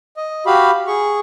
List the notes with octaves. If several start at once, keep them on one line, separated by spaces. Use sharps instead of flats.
D#5
F#4 G4 F5 B5
G#4 C#6